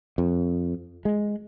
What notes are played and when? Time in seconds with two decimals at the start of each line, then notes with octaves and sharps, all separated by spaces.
0.18 F2
1.05 G#3